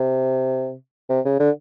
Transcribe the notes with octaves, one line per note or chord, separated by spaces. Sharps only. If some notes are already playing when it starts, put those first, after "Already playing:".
Already playing: C3
C3
C#3
D3